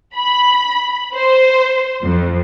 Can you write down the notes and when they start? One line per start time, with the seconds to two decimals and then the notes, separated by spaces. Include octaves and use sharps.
0.15 B5
1.14 C5
2.02 F2